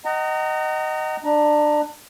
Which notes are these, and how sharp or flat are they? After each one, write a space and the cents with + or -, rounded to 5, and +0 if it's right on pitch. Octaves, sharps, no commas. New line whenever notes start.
D#5 +0 F#5 +35 A#5 -25
D4 +25 A#5 +25